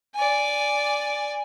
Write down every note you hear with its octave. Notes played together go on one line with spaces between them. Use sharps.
D5 G#5